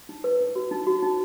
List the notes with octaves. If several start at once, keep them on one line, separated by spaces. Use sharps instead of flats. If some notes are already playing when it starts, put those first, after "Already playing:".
D#4
B4
D#4
F#4
D#4
F#4
D#4